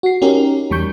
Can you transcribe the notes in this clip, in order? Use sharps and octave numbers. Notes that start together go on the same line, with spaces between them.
F#4 C7
C#4 D#4 G4 A#4
E2 G3 C#6 G6